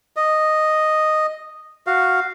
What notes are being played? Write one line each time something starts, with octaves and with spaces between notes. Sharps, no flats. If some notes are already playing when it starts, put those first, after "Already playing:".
D#5
F#4 F5